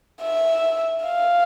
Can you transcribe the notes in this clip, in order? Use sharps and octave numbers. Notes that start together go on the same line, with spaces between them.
E5
F5